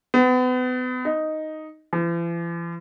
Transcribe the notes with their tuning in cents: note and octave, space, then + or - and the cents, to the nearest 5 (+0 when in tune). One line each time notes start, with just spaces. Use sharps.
B3 +35
D#4 +0
E3 +45